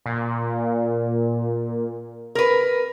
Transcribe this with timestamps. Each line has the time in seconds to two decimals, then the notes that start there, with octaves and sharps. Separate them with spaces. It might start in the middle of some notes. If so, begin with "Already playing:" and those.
0.06 A#2
2.35 A#4 B4